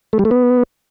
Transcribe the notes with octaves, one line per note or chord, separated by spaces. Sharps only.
A3
G3
A3
B3